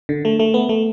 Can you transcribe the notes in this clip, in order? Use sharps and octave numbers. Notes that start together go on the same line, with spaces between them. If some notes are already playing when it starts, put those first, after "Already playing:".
D3
A3
A3
B3
A3